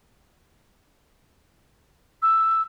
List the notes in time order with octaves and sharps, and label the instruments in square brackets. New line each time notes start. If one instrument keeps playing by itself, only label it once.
[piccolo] E6